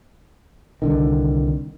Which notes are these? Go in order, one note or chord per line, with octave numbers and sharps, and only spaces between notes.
C2 D3 D#3